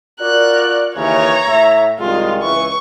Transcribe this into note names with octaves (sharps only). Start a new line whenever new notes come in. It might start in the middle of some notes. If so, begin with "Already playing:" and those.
F4 F#4 A#4 D5 F#6
D#2 C#3 E3 C#5 A#5
A2 E5
C2 D#3 G#3 F4
C#2 E3 C#6